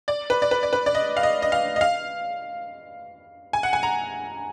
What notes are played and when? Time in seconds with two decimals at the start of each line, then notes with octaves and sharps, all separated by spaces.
0.08 D5
0.30 B4
0.42 D5
0.51 B4
0.63 D5
0.73 B4
0.86 D5
0.95 D#5
1.17 F5
1.23 D#5
1.42 D#5
1.52 F5
1.76 D#5
1.81 F5
3.53 G#5
3.63 F#5
3.73 G#5
3.83 A#5